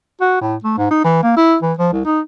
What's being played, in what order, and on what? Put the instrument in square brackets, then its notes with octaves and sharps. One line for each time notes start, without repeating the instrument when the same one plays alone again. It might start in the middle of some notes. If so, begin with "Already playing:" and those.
[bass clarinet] F#4
A2
A3
G#2
D#4
E3
A#3
E4
E3
F3
C2
D#4